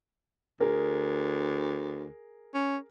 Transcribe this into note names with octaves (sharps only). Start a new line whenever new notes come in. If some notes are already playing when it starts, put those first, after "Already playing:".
D2 G#4 A#4
C#4